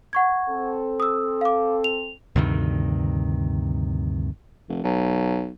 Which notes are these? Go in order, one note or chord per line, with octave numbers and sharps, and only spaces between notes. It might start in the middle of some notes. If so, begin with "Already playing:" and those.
F#5 C#6 G#6
C4 A4
D#6 E6
F5 D6
F7
D2 G2 C3 D#3
F1
B1